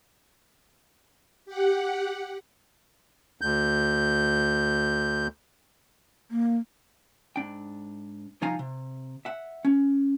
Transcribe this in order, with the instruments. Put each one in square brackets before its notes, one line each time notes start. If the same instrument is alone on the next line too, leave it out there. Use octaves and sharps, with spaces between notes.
[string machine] G4 F#5
[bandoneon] D2 G6
[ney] A#3
[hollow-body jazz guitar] G#2 D4 G5
C2 F3 D#4 F5 G#5 A#5
C3
E5 F#5
C#4